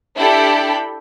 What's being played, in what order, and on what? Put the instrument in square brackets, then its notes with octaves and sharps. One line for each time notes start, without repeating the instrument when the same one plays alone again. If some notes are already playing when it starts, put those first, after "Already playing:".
[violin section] D4 E4 G4 A4 G5 B5